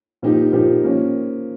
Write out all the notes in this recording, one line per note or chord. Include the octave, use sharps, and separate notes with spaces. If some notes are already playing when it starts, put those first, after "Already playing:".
A#2 F3 A#3 D#4 G4
A#2 F3 A#3 D#4 G4
F3 A#3 C#4